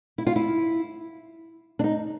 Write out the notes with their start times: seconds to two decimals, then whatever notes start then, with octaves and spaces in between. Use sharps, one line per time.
0.18 E4
0.27 F4
0.36 E4
1.79 D4
1.84 D#4